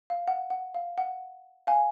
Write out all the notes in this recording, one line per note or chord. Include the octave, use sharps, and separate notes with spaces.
F5
F#5
F#5
F5
F#5
F5 G#5